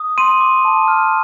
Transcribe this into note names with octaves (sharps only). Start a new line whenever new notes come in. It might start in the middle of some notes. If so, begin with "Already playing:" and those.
Already playing: D#6
C6 D#7
D6
A5
F6